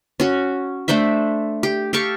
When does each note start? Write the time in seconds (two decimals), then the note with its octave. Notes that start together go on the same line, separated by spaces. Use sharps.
0.20 C#4 F#4
0.88 A3 D4 C5 E5
1.63 G4
1.93 G4 A4 F5 C#6